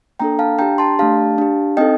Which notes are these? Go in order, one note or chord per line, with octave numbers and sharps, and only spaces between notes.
A#3 D4 A4 G5 A#5
F5 A5
D4 G4 G5 A#5
A5 C6
A3 D4 G4 F5 A5
D4 G4
C4 D#4 A4 D#5 G5